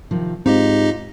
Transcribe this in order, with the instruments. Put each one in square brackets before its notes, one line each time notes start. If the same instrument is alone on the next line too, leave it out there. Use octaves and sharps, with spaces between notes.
[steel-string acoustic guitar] C3 D#3 F3
[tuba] G#2 [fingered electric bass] C4 [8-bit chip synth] D#4 G4 D#5 [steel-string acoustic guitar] F4